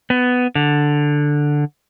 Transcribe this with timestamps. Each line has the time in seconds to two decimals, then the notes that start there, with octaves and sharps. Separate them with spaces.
0.10 B3
0.55 D3